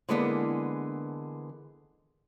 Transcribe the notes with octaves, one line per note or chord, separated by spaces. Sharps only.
D3 E3 G#3 A#3 B3 D4